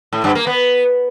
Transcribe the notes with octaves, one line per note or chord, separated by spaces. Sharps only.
A2
G2
A#3
B3